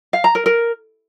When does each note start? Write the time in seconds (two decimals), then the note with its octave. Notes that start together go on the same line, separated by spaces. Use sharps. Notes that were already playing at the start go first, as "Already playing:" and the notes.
0.13 F5
0.24 A#5
0.35 A#4
0.46 A#4